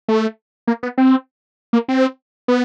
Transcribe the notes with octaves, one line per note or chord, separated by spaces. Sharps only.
A3
A#3
B3
C4
A#3
C4
B3